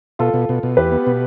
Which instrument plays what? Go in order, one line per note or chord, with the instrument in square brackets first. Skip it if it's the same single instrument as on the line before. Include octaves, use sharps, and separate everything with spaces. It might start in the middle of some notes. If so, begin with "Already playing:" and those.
[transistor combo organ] B2 [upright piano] F4 A4
[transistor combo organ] B2
B2
B2
[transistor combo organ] E2 [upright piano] G4 B4
[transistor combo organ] B3
B2